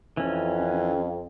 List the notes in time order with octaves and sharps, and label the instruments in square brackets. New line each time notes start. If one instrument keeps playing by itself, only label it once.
[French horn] F2 [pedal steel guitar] E3 C#4